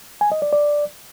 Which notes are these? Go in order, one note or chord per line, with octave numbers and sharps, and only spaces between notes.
G#5
D#5
D5
D5